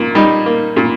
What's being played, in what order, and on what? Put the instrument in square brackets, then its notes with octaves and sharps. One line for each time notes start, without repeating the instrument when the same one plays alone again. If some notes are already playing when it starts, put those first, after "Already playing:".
Already playing: [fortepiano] A#2
G3 D#4
A#3
A#2